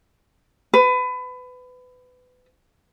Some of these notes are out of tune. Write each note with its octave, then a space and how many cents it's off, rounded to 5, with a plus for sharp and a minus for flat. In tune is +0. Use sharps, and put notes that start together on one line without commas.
B4 +25